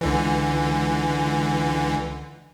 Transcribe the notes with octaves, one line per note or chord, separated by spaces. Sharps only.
C#2 D3 E3